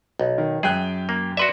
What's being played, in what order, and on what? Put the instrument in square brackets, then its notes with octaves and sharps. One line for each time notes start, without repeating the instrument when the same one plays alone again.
[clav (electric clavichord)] B1
[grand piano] D#3
[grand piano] F#2 G5 F#6 [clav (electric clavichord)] G#4
[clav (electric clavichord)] A#3
[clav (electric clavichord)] F#4 B4 E5 [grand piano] D5 C6